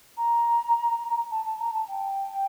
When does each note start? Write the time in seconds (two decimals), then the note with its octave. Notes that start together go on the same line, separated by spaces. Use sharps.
0.17 A#5
1.31 A5
1.45 A5
1.59 A#5
1.73 A5
1.88 G5